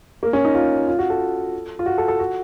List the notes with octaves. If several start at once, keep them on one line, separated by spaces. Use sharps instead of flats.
A#3
C#4
D#4
F4
F4
F#4
A4
F4
F#4
A4
A4
F#4